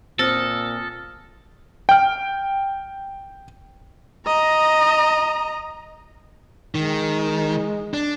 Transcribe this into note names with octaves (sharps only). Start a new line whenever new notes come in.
A#2 C4 A4 D#6 F6 A#6
G5 F6
D#5 A#5
D#3 G#3
D4